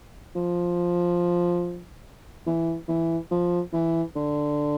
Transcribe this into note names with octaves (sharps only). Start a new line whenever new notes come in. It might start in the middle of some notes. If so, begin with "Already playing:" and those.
F3
E3
E3
F3
E3
D3